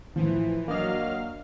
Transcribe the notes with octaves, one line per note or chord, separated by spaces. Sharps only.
A2 E3 F3
F#3 A#3 D4 D#5 F5 F6